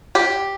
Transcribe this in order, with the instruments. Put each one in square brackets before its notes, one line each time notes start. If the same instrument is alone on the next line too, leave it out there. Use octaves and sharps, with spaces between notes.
[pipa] G4